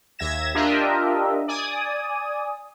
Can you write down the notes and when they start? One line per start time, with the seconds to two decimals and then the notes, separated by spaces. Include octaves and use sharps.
0.19 D#2 E5 G#6 A#6 E7
0.54 D4 F4 G4 A#4 D#5 E5
1.48 D5 G#5 D#6